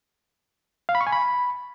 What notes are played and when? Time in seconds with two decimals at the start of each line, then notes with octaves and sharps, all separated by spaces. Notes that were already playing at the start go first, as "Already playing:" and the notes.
0.89 F5
0.95 B5
1.01 C#6
1.07 G#5
1.12 B5